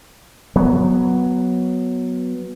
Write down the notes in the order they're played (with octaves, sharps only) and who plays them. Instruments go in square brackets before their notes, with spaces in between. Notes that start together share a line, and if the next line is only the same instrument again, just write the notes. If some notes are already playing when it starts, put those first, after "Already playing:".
[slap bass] F#3 B3